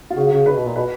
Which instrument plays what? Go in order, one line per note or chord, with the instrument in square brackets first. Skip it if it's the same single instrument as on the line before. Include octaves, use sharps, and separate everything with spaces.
[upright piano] F4
[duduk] C#3 [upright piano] F#4
[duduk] C#3
[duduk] C#3 [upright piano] B4
[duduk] B2
A#2
[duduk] B2 [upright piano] B4